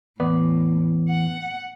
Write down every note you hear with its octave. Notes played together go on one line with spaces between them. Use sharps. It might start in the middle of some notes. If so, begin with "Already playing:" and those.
E2 A2 B3 D5
F#5